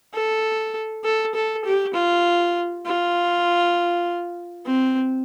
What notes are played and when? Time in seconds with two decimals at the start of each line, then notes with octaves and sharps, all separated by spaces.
0.14 A4
1.04 A4
1.35 A4
1.65 G4
1.94 F4
2.86 F4
4.66 C4